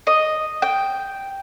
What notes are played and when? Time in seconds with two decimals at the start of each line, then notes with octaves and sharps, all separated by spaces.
0.07 D#5
0.62 G5